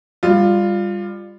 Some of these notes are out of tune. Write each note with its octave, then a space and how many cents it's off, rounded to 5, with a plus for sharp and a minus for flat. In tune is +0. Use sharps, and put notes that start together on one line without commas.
G3 +25 F4 +0